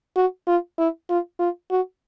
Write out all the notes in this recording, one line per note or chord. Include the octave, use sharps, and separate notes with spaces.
F#4
F4
E4
F4
F4
F#4